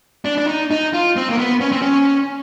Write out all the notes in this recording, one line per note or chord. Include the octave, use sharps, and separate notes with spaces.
D4
D4
D#4
D#4
F4
C4
A#3
B3
C#4
C4
C#4